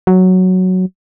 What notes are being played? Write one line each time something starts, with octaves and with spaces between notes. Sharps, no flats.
F#3